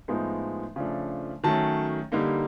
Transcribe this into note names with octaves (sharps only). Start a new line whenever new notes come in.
A2 F3 G#3 B3 D#4
C#3 F3 A3 D4
D#3 F#3 A3 C#4 A5
D3 G3 A#3 D#4